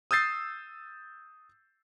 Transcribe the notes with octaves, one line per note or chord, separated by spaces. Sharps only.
D#6 E6 G6 A6 C7